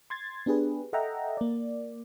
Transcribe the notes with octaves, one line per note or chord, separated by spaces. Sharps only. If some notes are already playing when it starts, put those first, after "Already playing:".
C6 G#6 A6
B3 D4 G4 G#4 B4
A4 D#5 E5 F#5 G5 A#5
A#3 D5